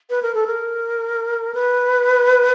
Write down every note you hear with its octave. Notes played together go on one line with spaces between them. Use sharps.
B4
A#4
A4
A#4
B4